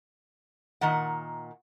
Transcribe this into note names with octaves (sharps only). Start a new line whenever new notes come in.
A#2 D#3 F#5